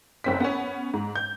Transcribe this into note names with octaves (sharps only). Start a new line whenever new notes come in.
F#1 C4 B6
B3 C#4
G#2
G6